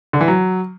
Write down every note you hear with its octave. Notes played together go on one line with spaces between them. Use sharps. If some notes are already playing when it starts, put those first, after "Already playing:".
D3
E3
F#3